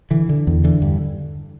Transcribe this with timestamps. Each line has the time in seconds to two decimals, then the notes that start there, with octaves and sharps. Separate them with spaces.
0.11 D3 E3
0.29 D3
0.47 E2
0.64 D3 E3
0.82 G2